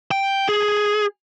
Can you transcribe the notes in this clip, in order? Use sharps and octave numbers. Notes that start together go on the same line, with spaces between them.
G5
G#4